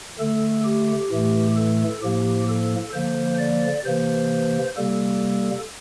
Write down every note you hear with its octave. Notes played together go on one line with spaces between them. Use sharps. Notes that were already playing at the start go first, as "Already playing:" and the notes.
D3 A3 A4
G4
A2 E3 A3
A4
A2 F3 A#3 G4
A4
D3 F3 A#3 C5
D5
C3 E3 A#3 C5
C3 G3 A#3 A4